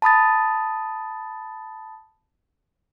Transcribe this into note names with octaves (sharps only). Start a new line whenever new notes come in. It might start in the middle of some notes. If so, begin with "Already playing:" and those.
A5 B5 D#6 A6